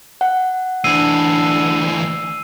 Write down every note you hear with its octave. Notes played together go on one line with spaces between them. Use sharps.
F#5
D2 E3 D4 E6 C7 D#7